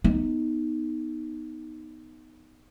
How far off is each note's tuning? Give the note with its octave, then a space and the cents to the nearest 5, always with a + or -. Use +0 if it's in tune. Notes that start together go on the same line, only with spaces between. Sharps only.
B3 +0 D#4 +0